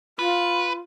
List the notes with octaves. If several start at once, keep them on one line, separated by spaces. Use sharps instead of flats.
F4 B4